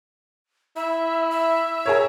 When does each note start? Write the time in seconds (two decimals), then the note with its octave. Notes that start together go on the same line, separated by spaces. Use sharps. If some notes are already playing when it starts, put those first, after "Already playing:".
0.76 E4 E5
1.31 E5
1.86 G#4 A#4 C#5